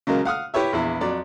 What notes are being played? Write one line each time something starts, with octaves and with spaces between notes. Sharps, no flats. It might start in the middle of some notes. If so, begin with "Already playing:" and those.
C#3 F#3 G#3 A#3
F5 F#5 D#6 F6
E4 G4 B4 C#5 E5
A#1 E2 E4
F2 F#3 D5